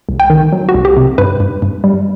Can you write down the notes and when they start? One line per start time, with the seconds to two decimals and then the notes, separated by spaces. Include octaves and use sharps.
0.09 C2
0.20 G5
0.30 D#3
0.52 F#3
0.69 F#4
0.74 C2
0.85 G4
0.97 C3
1.18 G2 B4
1.40 G2
1.62 G2
1.84 G3